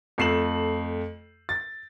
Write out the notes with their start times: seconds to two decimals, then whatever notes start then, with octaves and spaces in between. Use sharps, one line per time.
0.18 F2 A3 C7 E7 F#7
1.49 A6